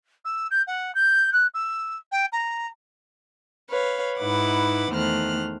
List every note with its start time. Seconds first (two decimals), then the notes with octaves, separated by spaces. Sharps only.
0.25 E6
0.51 G6
0.67 F#5
0.95 G6
1.33 F#6
1.54 E6
2.12 G5
2.32 A#5
3.69 B4 C#5 F5
4.19 G#2 D#4 E4 B4 F#5 D6
4.92 E2 D#3 A3 C5 F6 F#6